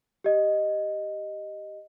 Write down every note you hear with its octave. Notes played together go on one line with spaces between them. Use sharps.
G4 D#5